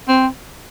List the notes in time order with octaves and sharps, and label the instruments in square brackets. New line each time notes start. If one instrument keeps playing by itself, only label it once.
[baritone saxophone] C4